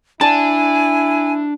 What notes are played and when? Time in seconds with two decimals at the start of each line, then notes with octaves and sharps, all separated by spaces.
0.21 D4 E4 G#5 A5